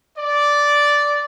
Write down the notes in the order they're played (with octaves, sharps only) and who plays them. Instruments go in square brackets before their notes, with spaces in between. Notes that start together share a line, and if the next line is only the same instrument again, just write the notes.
[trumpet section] D5